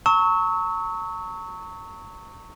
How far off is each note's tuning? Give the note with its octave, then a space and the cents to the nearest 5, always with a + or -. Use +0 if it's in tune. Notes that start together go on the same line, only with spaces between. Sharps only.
A#5 -45 C#6 +0 E6 -35